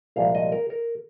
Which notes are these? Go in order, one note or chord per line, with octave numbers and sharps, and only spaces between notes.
C2 A#2 F3 G#3 F5
D#5
A#4
A#4